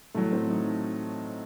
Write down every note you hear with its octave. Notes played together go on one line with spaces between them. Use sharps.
A2 F#3 A3
C4
D#4